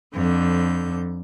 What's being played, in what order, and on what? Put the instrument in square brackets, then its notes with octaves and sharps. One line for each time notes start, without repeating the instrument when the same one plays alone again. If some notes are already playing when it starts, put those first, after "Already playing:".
[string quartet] F2 D3 G6